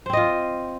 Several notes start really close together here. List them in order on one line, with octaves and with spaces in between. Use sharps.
C5 C4 D#5 F4